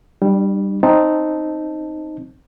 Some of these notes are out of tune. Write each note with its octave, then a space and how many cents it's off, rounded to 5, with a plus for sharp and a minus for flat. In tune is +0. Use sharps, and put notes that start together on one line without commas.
G3 +0 D4 +40
C4 +10 D#4 +0 A5 +0